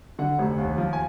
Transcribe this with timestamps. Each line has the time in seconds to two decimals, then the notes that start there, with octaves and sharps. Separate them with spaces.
0.19 D3 F#5
0.39 F1
0.58 D#2
0.78 F3
0.93 G#5